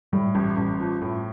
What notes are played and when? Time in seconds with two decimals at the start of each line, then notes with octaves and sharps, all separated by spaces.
0.13 A2 G3
0.35 A1
0.57 A1
0.80 F3
1.01 A2